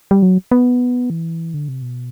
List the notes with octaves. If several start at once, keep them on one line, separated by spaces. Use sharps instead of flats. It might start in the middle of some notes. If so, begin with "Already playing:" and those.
G3
F#3
B3
E3
D3
C3
B2